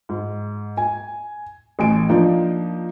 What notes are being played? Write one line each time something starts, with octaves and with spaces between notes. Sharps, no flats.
G#2
G#5
A1 G#5 D7
F3 A#3 D4 D#4